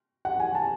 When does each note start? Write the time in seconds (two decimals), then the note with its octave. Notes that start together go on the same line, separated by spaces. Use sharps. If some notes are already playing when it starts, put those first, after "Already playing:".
0.25 F#5
0.40 G#5
0.55 A5